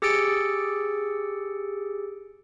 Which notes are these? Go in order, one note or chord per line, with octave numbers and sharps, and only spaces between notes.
G4 G#4 E6 A6 C#7 D7